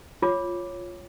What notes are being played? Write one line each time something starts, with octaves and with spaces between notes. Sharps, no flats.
F4 C#5 D6